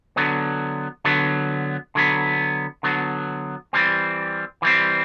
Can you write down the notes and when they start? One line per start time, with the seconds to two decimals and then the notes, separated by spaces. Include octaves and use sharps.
0.16 D3 F#3 B3
1.05 D3 F#3 B3
1.95 D3 F#3 B3
2.83 D3 F#3 B3
3.73 E3 G3 C4
4.62 E3 G3 C4